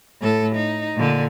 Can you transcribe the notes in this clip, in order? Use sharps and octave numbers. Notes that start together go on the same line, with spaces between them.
A2 A4
D#4
A#2 D3